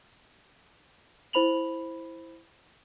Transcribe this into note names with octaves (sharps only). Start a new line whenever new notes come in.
E4 C5 B5 F7 F#7